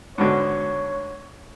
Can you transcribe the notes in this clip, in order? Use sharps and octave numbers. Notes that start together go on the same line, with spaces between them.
G#2 B2 D3 C#5